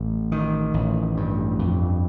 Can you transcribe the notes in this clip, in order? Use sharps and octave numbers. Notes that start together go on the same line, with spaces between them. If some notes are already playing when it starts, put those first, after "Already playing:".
Already playing: A1
D#3
A1
G2
F2